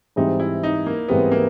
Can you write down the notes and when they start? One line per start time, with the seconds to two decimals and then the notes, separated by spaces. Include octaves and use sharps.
0.16 G#2 E3 G3 C4 D#4
0.40 E4
0.63 D#4
0.86 A#3
1.08 G#2 E3 G3 B3 C4
1.31 A#3